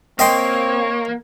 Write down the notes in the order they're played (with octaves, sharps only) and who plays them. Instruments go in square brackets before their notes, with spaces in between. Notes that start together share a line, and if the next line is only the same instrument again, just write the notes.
[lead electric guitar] A#3 [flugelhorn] C4 [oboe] C#5 [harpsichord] D#5 G5 C6